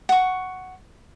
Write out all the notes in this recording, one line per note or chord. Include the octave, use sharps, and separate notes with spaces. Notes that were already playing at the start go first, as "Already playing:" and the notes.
F#5 C#6